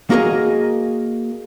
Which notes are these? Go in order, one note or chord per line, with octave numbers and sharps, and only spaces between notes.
A#3 F#4 G#4 A#4 D#5